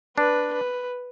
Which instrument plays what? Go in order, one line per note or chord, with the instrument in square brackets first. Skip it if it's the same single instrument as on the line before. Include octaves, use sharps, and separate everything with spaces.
[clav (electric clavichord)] D4 [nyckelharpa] B4
[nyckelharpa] B4